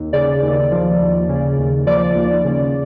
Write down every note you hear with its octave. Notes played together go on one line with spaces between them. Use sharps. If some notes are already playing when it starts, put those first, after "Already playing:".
Already playing: D#2
C#3 D5
D#2
F3
D#2
C#3
D#2
F3 D5
D#2
C#3